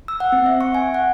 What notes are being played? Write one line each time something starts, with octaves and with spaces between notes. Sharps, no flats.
E6
F#5
C4
E5
C#6
G#5
F#5